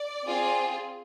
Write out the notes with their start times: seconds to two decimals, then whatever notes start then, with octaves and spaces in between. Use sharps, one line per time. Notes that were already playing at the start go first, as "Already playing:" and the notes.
Already playing: D5
0.27 C4 F4 G#4